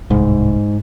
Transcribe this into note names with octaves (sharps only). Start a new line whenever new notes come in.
D1 C2 G#2